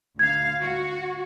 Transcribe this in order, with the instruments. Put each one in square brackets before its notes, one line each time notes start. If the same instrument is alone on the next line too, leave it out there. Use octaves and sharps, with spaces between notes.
[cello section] D2 F5 [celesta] G#6
[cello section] F#4